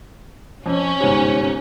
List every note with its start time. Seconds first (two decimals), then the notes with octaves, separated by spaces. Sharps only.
0.66 F2 C#4
1.00 G1 G#2 C3